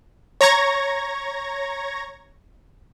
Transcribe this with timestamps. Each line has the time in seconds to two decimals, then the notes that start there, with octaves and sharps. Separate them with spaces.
0.41 C#5 A#5 C#6 G#6 A#6